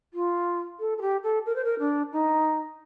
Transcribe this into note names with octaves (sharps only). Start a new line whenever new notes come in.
F4
A4
A4
G4
A4
A#4
C5
A#4
D4
D#4